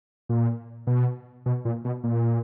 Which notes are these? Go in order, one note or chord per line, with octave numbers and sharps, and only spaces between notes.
A#2
B2
B2
A#2
B2
A#2